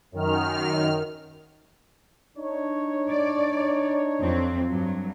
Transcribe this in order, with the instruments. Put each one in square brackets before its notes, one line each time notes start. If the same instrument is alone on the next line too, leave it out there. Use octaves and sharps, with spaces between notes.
[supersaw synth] F#2 D#3 F6
[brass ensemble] D4 D#4 C#5
[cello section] D5
F2 F#3 C4
G2 F#3